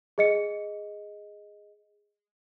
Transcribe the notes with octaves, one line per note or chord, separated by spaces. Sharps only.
G#4 D#5 C#7